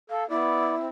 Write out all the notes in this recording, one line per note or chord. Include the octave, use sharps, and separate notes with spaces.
A4 F5
B3 E4 D5
C4